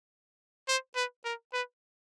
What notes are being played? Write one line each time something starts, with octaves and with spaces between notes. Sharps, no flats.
C5
B4
A#4
B4